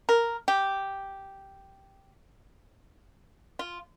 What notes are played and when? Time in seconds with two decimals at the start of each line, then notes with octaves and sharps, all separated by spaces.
0.09 A#4
0.48 G4
3.59 F4